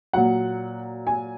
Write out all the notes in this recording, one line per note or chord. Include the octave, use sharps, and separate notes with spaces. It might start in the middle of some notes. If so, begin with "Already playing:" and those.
A#2 F#3 F#5
G#5